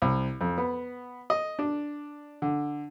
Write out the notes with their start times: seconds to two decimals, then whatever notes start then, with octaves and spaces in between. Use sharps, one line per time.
0.02 C2
0.41 F2
0.58 B3
1.30 D#5
1.59 D4
2.42 D3